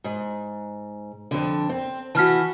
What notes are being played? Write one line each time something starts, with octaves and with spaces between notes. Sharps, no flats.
G#2
F2 D3
C4
E3 F#4 A5 F6 B6